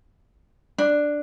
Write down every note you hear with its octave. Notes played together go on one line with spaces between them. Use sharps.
D4